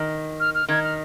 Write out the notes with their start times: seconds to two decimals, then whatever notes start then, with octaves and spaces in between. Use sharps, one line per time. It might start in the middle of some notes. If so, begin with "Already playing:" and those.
Already playing: D#3
0.40 F6
0.55 F6
0.69 D#3 G#6
0.84 F6